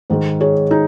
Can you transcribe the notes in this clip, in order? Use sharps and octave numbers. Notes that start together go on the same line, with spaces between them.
G#2 D#3 G#3
G#4 C#5
D#4 G#4